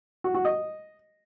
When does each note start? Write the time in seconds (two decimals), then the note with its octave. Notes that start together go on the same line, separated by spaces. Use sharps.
0.24 F#4
0.35 F#4
0.45 D#5